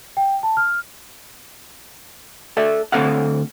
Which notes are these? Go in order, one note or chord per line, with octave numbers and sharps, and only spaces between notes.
G5
A5
F6
A4 D5 E5
D2 A3 C4 A4 F5 F#5